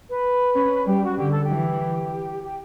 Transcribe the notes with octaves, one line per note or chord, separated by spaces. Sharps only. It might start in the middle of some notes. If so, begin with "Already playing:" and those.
B4
C#4
G3 G4
F#4
D3 G4
A4
G4
E3
G4